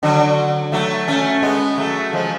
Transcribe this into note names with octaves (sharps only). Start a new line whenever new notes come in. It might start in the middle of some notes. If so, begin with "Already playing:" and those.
D3 F#3
F#3 A3
A3 C#4
G#3 B3
F#3 A3
F3 G#3